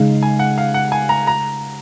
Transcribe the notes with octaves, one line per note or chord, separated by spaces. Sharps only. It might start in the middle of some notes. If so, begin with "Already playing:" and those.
Already playing: C#3 G#3 D#4 F5
G#5
F#5
F5
F#5
G#5
A#5
A#5